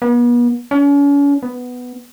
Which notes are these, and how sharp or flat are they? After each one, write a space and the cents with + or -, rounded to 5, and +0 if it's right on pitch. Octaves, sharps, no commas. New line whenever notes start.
B3 -40
C#4 +40
B3 +5